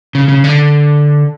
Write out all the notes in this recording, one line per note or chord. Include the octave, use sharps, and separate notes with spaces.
C#3
C#3
D3